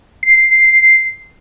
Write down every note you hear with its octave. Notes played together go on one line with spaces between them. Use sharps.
C7